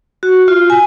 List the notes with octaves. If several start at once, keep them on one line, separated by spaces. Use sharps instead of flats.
F#4
F4
G#5